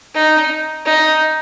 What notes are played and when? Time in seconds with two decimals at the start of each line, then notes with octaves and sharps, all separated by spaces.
0.15 D#4
0.85 D#4